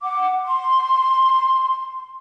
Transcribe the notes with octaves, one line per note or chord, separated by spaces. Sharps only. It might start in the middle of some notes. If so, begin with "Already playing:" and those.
F#5 D6
C6